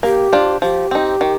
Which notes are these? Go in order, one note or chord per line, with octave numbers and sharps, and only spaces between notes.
A#3 G4
D4 F4 C5
F3 G4
C4 D#4
D#3